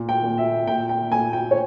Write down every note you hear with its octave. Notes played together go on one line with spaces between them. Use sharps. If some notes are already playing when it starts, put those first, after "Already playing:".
Already playing: A#2
G5
A#2
E5
A#2 G5
G5
A#2 G#5
G5
C#5